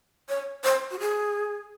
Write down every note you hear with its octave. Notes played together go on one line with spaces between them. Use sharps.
C#5
C5
F#4
G#4